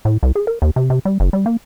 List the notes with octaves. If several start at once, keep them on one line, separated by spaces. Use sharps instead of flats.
A2
C2
G#4
A#4
D#2
C3
C3
G3
F#1
G3
A#3